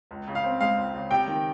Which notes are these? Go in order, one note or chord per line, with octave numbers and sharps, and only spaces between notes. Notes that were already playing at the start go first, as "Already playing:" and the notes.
C#2
C#3
F5
C4
G#3 F5
C#2
C#3
C3 G5
D#3